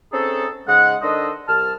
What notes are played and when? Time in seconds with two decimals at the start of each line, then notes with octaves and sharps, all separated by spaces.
0.13 C4 C#4 D#4 G#4 A4
0.67 G#2 C#3 G#3 D#5 F#5
1.02 D#3 D4 A4 C5 D#5
1.48 C2 A5 F6